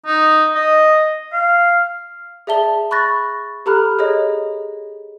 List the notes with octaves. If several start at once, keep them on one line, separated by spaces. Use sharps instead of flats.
D#4
D#5
F5
G#4 D5 E5 A5 G7
B5 C#6 F#6 A6 A#6
G4 A4 A#5 B5 F6 F#6
G#4 C#5 D#5